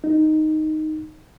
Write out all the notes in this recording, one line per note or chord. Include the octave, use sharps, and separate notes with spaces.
D#4